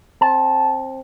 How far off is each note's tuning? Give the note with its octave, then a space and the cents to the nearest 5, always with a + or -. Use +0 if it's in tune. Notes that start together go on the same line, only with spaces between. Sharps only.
C4 +20 A5 -10